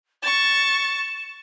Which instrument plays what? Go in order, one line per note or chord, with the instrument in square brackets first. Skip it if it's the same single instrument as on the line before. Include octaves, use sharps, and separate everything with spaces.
[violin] C#6 A6 [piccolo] E7